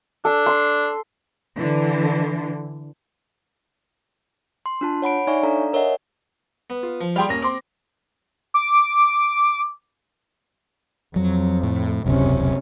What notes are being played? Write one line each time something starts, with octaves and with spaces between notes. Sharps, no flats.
D4 A4
C6
D3 E3
C6
D4 F4 A5
C#5 F#5 B5 D7
D#4 C#5 D5 E5 G#5 C#6
D4 A4 D5 F5 A#5
A#4 C#5 D#5 E5 F#5 G#5
B3
F4
F3
G3 F4 G#4 G5 C6
D#1 A#3 C#4 A#6
C4 C6 D6
D6
F2 F#3
A2
E1 C#2 F#2 C3 C#4